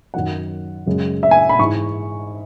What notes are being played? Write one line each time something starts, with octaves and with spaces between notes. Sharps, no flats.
F#2 D#3 F#3 F#5
F#2 C#3 G#3
E5
G#5
B5
G#2 E3 G#3 C#6